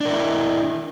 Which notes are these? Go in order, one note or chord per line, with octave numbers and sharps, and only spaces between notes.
D4 E4 A#4